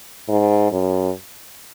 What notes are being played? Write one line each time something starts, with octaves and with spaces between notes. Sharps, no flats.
G#2
F#2